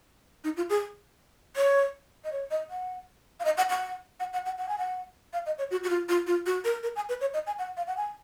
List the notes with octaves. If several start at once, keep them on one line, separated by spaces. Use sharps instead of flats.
D#4
F4
G#4
C#5
D#5
C#5
D#5
F#5
F5
D#5
F#5
F#5
F#5
F#5
F#5
F#5
G#5
F#5
F5
D#5
C#5
F#4
F#4
F4
F4
F4
F#4
A#4
A#4
G#5
B4
C#5
D#5
G#5
F#5
F5
F#5
G#5